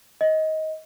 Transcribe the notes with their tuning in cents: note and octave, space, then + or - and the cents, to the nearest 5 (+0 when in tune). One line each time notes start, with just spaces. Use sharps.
D#5 +20